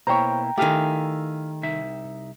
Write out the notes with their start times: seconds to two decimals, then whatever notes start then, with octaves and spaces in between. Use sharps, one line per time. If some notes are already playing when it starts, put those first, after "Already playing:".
0.07 B2 A#3 E4 C5 C#5 G5 A#5
0.58 D#3 A3 E4 G4 F5 G#5
1.63 C2 D#4 E5